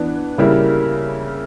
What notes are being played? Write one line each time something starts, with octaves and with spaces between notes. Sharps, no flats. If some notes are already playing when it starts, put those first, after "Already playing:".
Already playing: E3 B3 D4
C#3 G3 A#3 E4